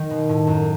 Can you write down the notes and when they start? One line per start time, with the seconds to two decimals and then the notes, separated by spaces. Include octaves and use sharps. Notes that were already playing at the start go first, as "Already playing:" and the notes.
Already playing: D#3
0.10 B2
0.29 A2
0.47 F#2